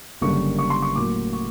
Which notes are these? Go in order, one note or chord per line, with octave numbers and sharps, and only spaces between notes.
F#1 F#2 D3 G3 A#3 C#6
C#6
C6
C#6
A2 F#3 A#3 D6
C#6